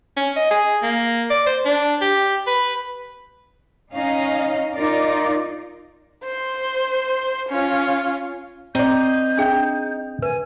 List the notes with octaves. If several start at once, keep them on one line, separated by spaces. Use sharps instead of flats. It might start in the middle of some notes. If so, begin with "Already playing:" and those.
C#4
D#5
G#4
A#3
D5
C5
D4
G4
B4
C#4 D#4 D#5 F5
D#4 F4 A#4 D5
C5 C6
C#4 F4
C4 D#4 D5 G6
D4 G#4 G5
B4 G#5